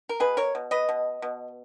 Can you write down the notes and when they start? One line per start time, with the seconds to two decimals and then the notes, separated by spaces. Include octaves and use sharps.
0.09 A#4
0.20 B2 G#4 B4
0.37 A#4 C#5
0.55 B2
0.71 B4 D#5
0.89 B2
1.22 B2